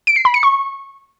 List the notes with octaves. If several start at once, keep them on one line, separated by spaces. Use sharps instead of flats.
D7
C7
B5
C#7
C#6